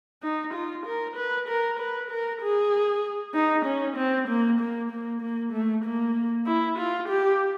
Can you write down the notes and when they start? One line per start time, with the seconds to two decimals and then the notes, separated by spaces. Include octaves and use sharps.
0.23 D#4
0.54 F4
0.86 A#4
1.16 B4
1.48 A#4
1.79 B4
2.11 A#4
2.42 G#4
3.34 D#4
3.65 C#4
3.96 C4
4.28 A#3
4.60 A#3
4.91 A#3
5.21 A#3
5.52 A3
5.84 A#3
6.46 E4
6.78 F4
7.08 G4